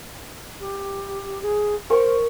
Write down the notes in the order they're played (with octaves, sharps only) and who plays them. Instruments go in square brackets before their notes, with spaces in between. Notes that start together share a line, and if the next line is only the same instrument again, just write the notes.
[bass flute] G4
G#4
[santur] A#4 C#6 [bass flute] C5